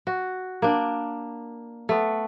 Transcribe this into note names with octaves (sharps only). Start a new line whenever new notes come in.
F#4
A#3 D4
A3 B3